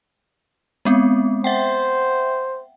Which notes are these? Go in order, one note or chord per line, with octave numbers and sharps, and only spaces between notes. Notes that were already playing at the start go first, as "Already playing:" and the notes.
G#3 B3 C4
C5 E5 F#5 G5